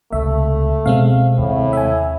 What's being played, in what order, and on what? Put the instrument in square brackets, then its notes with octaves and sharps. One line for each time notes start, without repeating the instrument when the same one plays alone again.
[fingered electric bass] C#2 C3 [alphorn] A3 [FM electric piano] E5
[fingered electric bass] B2 B3 [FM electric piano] G#3 C4 F5
[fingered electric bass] D#2 C3 [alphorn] A2
[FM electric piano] E5 G#5